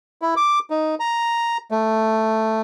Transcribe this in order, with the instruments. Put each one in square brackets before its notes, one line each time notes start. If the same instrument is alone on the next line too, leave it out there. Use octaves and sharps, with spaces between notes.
[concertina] E4
D6
D#4
A#5
A3